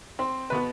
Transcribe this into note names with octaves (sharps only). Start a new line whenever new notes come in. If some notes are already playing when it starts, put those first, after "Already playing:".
C4 C5
B2 B3 B4